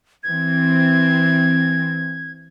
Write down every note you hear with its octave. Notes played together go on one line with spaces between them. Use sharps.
E3 C4 G#6